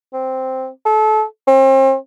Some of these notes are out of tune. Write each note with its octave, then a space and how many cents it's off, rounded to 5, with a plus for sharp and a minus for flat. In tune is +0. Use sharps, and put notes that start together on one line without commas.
C4 +0
A4 -30
C4 +40